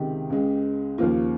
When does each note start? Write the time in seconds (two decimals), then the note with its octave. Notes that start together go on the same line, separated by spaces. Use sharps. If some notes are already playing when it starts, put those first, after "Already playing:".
Already playing: C#2 C3 D#3 G#3 G4
0.30 C#2 C#3 G#3
0.98 D#2 C#3 F3 A#3 F4